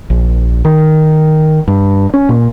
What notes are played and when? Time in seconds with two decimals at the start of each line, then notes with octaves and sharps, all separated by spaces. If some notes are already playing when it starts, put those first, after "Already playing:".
0.10 A#1
0.65 D#3
1.68 G2
2.14 C#4
2.29 A#2